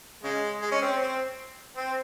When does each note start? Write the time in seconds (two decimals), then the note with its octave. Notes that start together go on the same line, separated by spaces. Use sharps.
0.24 C#3 G#3
0.62 G#3
0.72 C#4
0.82 C4
1.01 C4
1.77 C4